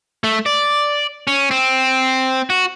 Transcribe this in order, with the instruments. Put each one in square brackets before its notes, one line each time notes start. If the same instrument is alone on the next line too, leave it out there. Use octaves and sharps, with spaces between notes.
[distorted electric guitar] A3
D5
C#4
C4
F#4